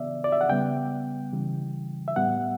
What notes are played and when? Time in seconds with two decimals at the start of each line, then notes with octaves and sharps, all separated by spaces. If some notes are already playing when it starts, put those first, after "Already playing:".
Already playing: C#3 E3 B3 D5 E5
0.24 D5
0.32 E5
0.41 F#5
0.49 C#3 G3 B3 G5
1.33 C#3 E3 G3
2.08 E5
2.16 A2 G3 B3 F#5